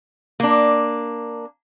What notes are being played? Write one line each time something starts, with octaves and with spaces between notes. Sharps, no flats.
A#3 D4